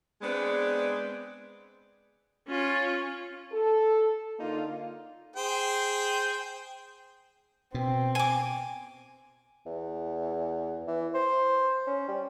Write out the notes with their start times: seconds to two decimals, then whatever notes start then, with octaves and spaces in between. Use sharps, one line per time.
0.22 G#3 B3 C4 D4 G#4 D5
2.49 C#4 F4
3.52 A4
4.39 D3 A#3 D#4 F4
5.36 G#4 C5 G5
7.74 B2 C4
8.15 G#5 D6
9.66 E2
10.88 E3
11.14 C5
11.87 C#4
12.08 G3